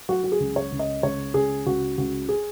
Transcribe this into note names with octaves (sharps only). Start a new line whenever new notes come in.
F#3 F#4
F#4
G#4
C#2
C#5
C#2
D#5
C#2 C#5
C#2 G#4
C#2 F#4
C#2 F#4
G#4